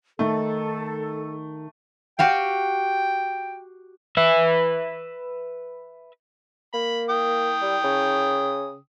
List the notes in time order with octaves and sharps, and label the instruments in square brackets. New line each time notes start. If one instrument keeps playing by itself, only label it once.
[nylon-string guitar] D#3 D#4 [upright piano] A3 [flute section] A4
[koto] F#4 G4 F5 [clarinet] G5
[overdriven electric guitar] B4 E5
[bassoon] A#3 [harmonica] B5
[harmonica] G5 D#6
[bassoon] G3
C#3